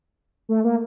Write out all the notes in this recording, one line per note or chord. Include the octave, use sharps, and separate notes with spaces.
A3
A#3